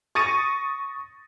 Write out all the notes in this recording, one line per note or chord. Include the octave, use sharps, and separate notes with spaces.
C#6 D#6 A6 A#6 C#7 D#7